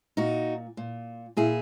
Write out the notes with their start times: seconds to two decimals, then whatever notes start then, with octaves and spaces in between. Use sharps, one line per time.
0.17 A#2 D#4 F#4
0.77 A#2
1.37 A#2 E4 G#4